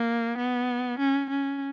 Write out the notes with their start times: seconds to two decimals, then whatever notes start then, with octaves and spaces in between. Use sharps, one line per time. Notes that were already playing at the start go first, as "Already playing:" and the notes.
Already playing: A#3
0.38 B3
0.99 C#4
1.30 C#4